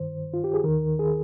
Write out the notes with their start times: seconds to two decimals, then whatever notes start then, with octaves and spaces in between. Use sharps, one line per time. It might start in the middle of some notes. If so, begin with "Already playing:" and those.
Already playing: G2 D#3 C5
0.34 F4
0.44 G4
0.54 G#4
0.64 D#2 D#3 A#4
0.99 G#4